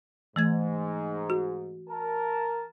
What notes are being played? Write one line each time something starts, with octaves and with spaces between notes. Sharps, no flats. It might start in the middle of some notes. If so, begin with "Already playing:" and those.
G#2 E3 A3 G#6
F#4
A#4 A5